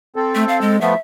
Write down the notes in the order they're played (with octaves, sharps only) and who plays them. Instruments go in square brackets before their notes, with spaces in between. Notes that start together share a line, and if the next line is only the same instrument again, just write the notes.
[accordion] C4 A4
[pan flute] A3
F5
G#3
[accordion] F3 A3 B3 [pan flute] E5